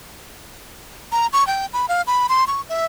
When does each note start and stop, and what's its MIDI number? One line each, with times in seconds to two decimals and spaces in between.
1.12 1.27 82
1.33 1.46 85
1.47 1.66 79
1.73 1.86 83
1.89 2.02 77
2.07 2.27 83
2.29 2.44 84
2.47 2.61 85
2.69 2.85 76